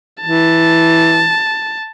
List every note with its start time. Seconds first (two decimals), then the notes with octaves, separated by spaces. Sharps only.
0.22 E3 A5